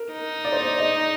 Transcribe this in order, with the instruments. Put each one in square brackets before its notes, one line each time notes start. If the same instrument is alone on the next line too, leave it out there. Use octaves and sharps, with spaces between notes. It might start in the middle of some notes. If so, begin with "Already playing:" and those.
Already playing: [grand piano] A#4
[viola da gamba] D#4
[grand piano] D5
C5
D5
D#5